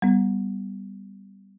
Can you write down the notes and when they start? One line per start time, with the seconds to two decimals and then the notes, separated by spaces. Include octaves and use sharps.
0.02 G3 B3